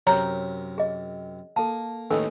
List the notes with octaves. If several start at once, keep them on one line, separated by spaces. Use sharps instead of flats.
F#2 C3 A#4 C#5 A#5
G#4 D#5
A#3 A4 A5
D#2 A2 C#4 D#4 A4 B4 G#5